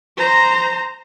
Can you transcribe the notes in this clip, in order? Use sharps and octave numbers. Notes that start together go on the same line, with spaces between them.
C5 A#5